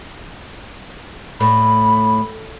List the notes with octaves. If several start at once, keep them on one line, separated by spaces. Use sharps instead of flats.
A2 B5